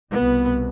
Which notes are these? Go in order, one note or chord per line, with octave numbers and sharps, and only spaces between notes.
C2 B2 B3